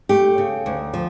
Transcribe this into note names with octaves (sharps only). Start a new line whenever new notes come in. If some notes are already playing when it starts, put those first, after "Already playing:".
A3 G4
C#3
D2
F3